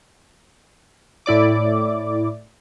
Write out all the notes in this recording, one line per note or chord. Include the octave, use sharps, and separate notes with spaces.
A2 E4 D5 D6